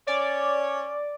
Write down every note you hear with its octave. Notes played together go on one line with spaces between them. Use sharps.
C#4 C#5 D5